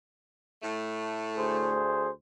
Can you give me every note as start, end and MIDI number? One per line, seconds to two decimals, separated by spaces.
0.63 1.79 45
0.63 1.79 57
1.36 2.08 38
1.36 2.08 68
1.36 2.08 72